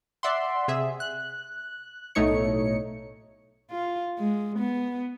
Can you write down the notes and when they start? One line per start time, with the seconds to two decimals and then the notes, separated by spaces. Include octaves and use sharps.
0.23 D5 E5 F#5 C6
0.68 C3 G#4 E5
1.00 F#6
2.15 B1 A2 A3 D#4 C#5 C#7
3.71 F4
4.18 G#3
4.60 B3